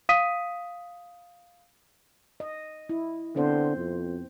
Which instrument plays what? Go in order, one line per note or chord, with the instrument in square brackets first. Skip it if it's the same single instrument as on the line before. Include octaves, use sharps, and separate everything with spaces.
[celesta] F5 D#6 B6 D#7
[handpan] D#5
E4
[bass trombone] D3 [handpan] B3 C4 C5
[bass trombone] F2